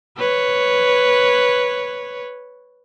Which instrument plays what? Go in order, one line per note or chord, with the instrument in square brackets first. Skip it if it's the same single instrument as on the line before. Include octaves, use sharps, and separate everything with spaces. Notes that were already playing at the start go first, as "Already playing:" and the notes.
[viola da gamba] B4 C#5